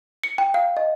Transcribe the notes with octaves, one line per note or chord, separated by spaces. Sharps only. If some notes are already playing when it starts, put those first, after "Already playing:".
C#7
G5
F5
D#5